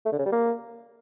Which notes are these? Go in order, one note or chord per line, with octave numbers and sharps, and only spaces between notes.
A3
D3
C#3
G3
A#3